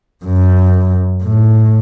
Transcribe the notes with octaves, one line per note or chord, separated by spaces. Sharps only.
F#2
A2